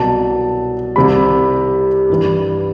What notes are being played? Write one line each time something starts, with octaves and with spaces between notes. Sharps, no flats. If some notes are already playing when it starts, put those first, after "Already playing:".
Already playing: C2 B2 F#3 A5
C2 C3 G3 B5
G2 E3 G3